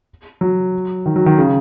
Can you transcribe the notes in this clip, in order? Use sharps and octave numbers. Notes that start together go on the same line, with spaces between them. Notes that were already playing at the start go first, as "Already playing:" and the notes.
F#3
D#3
F#3
D#3
C#3